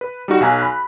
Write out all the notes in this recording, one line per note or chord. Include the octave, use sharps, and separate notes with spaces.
B4
G3 D#4 F#4
B1 F5 G#5 A#5 F#6
B5